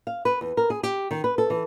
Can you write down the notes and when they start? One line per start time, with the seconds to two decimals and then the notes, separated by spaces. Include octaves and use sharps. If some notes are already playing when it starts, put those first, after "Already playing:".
0.07 F5
0.25 B4
0.41 E2
0.57 A#4
0.70 G#4
0.83 G4
1.11 D#3
1.24 B4
1.38 A4
1.50 E3